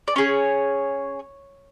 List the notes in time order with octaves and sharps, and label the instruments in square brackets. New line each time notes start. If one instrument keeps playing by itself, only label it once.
[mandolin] D5
C#4 G#4 C#5